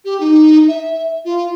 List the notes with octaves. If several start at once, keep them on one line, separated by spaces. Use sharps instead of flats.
G4
D#4
E5
F4